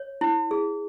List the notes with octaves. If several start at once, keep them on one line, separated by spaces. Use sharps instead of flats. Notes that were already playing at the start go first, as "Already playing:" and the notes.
Already playing: C#5
E4
G#4